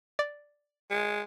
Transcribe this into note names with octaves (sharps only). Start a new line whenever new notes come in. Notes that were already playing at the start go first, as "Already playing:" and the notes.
D5
G#3